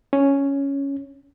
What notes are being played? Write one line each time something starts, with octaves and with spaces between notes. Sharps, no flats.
C#4